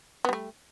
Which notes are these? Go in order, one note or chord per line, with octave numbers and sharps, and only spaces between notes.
G3 A3 B3